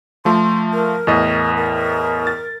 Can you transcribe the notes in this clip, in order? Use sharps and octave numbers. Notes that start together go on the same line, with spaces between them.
F3 A3 F4 C6
A#4
E2 A2 D#5
A#4
A6